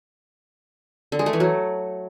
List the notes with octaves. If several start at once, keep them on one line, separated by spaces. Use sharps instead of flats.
D3
G#3
A3
E3
F#3